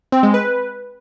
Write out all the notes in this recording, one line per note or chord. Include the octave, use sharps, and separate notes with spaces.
C4
G#3
B4